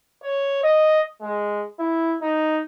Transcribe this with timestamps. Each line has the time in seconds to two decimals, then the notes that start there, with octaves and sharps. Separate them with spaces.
0.23 C#5
0.64 D#5
1.22 G#3
1.79 E4
2.22 D#4